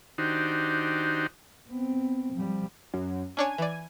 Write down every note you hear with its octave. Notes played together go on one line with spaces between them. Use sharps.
D#3 D4 D#4 F#4 G4 C5
B3 C4
F3 G3
F#2
C#4 D4 C#5 G#5
E3 D5